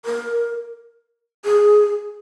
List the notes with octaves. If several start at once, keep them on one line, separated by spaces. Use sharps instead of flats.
A#4
G#4